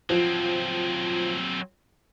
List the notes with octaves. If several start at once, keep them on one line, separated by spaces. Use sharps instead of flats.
F3 F#3 C4